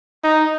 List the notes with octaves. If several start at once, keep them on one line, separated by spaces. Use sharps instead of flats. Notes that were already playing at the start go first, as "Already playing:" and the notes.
D#4